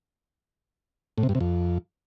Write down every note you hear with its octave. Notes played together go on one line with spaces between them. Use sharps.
A2
C3
G2
C3
F2